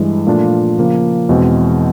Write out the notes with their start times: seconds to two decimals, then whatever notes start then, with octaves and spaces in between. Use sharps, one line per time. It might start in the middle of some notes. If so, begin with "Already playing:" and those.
Already playing: G2 E3 G#3
0.27 A#2 F3 A3 D4 F4
0.78 C#3 F3 A#3
1.29 E2 B2 G#3 C4